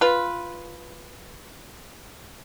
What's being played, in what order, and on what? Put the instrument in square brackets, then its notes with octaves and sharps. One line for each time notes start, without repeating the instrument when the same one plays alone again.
[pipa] F4 B4